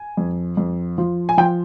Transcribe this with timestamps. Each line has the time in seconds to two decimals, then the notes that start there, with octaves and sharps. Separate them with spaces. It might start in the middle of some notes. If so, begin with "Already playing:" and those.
Already playing: G#5
0.17 F2
0.57 F2
0.98 F3
1.29 G#5
1.37 F3 G5